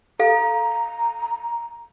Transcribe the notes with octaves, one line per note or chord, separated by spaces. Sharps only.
A4 F5 A#5